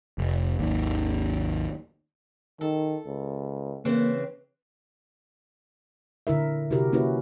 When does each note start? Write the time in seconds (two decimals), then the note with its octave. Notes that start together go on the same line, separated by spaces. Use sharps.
0.18 F1
0.59 G#1 D#2
2.61 D#3 A4
3.07 C#2
3.85 C#3 E3 A#3 C4
6.27 A#2 D3 E4 A#4 E5
6.70 C3 E4 F#4 G4 A#4
6.92 A#3 C#4 E4 F#4 B4